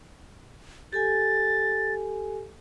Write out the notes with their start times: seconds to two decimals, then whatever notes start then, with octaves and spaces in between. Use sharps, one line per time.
0.93 G4 A4 G#5 A6